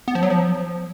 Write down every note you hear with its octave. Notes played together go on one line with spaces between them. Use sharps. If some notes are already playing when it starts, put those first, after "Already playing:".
B3
F3
F#3
F3